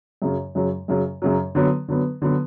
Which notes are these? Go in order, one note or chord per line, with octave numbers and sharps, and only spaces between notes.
F#2 C#3 F#3
F#2 C#3 F#3
F#2 C#3 F#3
F#2 C#3 F#3
D3 F#3 B3
D3 F#3 B3
D3 F#3 B3